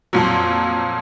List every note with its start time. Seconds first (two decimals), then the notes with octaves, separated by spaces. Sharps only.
0.13 F2 A#2 F#3